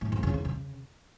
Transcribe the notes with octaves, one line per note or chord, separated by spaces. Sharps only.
A2
F2
C#3
E2
C#3